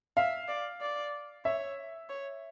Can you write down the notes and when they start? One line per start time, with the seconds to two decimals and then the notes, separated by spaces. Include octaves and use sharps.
0.17 E5 F5
0.48 D5
0.81 D5
1.45 C#5 E5
2.09 C#5